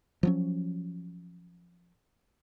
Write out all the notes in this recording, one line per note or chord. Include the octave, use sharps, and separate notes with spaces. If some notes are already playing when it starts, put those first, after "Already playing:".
F3 F#3 C#4